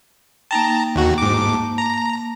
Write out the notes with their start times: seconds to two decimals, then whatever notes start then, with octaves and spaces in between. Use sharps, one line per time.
0.51 A#3 D#4 G5 A5 A#5
0.96 D#2 F#4
1.18 G#2 D6
1.34 A#3 A5
1.78 A#5